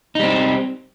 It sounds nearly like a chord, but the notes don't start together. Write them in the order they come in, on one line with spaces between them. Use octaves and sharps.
D#4 G3 C4